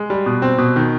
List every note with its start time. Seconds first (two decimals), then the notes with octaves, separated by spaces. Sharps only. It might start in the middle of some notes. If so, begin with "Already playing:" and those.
Already playing: G#3
0.10 G3
0.26 B2
0.42 C4
0.58 B2
0.76 D#3